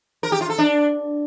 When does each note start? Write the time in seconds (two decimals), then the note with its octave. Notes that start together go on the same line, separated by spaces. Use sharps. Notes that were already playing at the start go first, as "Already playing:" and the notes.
0.23 A#4
0.32 G4
0.41 F4
0.50 A4
0.58 D4